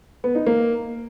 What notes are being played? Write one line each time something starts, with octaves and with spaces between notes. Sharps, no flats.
B3
D#4
A#3